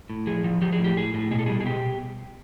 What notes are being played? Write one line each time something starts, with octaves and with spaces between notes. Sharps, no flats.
A2
F3 G#4
F3
F3 G4
G#4
A2
G4
A2 G#4
A2
B2 G#4
A4
G3 G#4
G#4
B2 G4